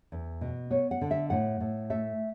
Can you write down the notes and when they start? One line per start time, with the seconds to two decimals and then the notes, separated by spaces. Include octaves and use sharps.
0.12 E2
0.41 B2
0.70 B3 C#5
0.91 F#5
1.01 D3
1.11 E5
1.30 A2 F#5
1.60 A2
1.90 A3 E5